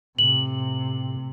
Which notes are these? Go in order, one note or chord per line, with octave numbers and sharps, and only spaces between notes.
A2 C3 F#7